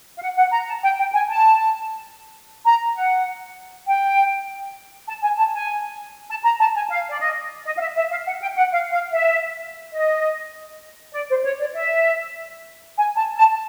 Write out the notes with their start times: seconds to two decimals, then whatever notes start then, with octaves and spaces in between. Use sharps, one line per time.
0.17 F5
0.22 F#5
0.37 F#5
0.52 A#5
0.67 A5
0.83 G5
0.98 G5
1.13 G#5
1.28 A5
2.65 A#5
2.95 F#5
3.86 G5
5.07 A5
5.23 G#5
5.38 A5
5.53 G#5
6.29 A5
6.44 A#5
6.59 A5
6.75 G#5
6.89 F5
7.10 D5
7.20 D#5
7.65 D#5
7.76 F5
7.80 E5
7.95 E5
8.11 F5
8.26 F#5
8.41 G5
8.56 F#5
8.71 F5
8.92 F5
9.12 E5
9.93 D#5
11.14 D5
11.29 C5
11.44 C#5
11.59 D5
11.74 E5
12.96 G#5
13.16 A5
13.36 A5